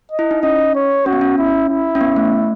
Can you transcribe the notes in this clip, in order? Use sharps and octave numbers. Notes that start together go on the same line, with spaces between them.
D#5
E4
D#4
C#4 D#5
C#5
C#4 F#4
B3
C#4
E4
E4
C#4
B3
A3